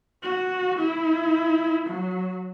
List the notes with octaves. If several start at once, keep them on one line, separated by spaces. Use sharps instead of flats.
F#4
E4
F#3